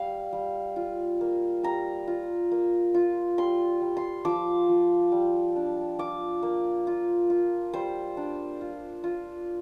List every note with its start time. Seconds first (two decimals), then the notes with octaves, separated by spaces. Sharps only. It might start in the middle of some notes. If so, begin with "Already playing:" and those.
Already playing: G3 F5
0.33 G3
0.76 F4
1.21 A#3
1.63 G3 A#5
2.07 F4
2.51 A#3
2.94 F4
3.38 G3 C6
3.82 G3
3.97 C6
4.25 F3 D6
4.69 F3
5.12 G3
5.56 D4
5.99 F4 D6
6.43 A#3
6.87 F4
7.30 F4
7.73 G3 C5
8.17 D4
8.61 F4
9.04 F4